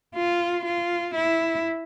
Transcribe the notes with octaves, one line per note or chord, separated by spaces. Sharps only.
F4
F4
E4